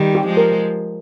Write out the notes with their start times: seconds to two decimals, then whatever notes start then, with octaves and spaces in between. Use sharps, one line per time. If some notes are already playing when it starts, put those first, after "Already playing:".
Already playing: D#3 G3
0.15 G4
0.26 F3 G#3
0.37 A#4